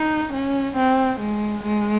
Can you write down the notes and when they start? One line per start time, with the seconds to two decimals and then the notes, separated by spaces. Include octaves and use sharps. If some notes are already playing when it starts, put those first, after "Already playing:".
Already playing: D#4
0.33 C#4
0.76 C4
1.19 G#3
1.63 G#3